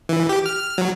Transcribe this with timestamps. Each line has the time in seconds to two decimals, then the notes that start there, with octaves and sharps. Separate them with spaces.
0.09 E3
0.29 G4
0.46 F6
0.78 F#3